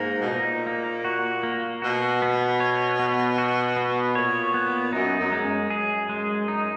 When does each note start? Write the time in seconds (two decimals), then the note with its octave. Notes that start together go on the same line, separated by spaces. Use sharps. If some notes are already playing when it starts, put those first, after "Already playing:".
Already playing: G#2 A#3
0.18 B2
0.27 A#2 D#4
0.66 A#3
1.04 F#4
1.43 A#3
1.82 B2 F#4
2.22 B3
2.60 C#5
2.99 B3
3.38 F#4
3.77 B3
4.15 A#2 C#5
4.54 B3
4.93 F#2 D#4
5.19 F#2
5.32 G#3
5.45 F#2
5.70 G#4
6.09 G#3
6.48 D#4